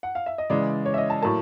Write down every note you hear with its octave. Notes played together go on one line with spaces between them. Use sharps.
F#5
F5
E5
D#5
C#3 E3 G#3 D5
C#5
E5
D#5
A5
A2 F#3 A#3 A5